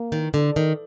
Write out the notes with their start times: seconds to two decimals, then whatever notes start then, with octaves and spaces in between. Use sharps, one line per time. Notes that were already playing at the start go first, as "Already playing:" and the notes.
Already playing: A#3
0.12 D#3
0.34 D3
0.56 D#3